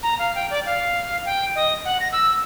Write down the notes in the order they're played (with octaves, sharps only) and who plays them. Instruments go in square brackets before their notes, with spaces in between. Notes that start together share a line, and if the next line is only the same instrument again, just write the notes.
[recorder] A#5
F5
G5
D5
F5
G5
D#5
F#5
A#6
E6